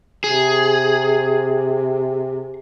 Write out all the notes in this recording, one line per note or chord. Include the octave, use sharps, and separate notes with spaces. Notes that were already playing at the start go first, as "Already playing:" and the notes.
C3 G#4